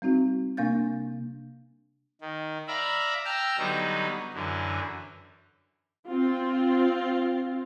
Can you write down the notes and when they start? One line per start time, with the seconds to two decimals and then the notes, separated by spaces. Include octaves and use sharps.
0.02 G3 C4 D#4 F#4
0.57 C3 A#3 D4 F5 G6 A6
2.21 D#3
2.68 D5 E5 F5 A#5 B5
3.25 G5 A5 A#5 E6 F6
3.58 D3 F#3 G3 B3 D#4
4.34 F#2 D3 E3
6.07 C4 F4